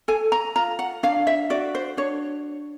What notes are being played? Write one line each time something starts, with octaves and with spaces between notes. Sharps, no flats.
A4 G#5
A#5
F4 A#5
F#5
D4 F5
E5
F#4 D5
C5
D4 C#5